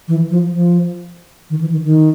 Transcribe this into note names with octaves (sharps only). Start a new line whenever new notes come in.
E3
F3
F3
D#3
E3
D#3
D#3